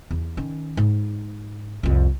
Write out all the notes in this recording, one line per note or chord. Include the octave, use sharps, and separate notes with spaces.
E2
D#3 C#4
G#2
C2 F2